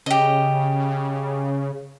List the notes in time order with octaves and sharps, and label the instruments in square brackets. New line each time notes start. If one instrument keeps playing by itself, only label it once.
[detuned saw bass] C#3 [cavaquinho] G4 D#5